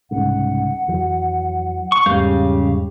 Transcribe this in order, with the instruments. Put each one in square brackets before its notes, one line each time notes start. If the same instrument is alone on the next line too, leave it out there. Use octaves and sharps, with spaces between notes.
[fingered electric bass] C2 G#2 C#3 [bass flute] F#5
[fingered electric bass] F2 E3 F#3
[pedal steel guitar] C#6
[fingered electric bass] E2 G#2 G3 [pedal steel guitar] C#3 F5 G6 [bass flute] G4